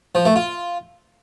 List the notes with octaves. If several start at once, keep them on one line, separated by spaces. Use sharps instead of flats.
F3
A3
F4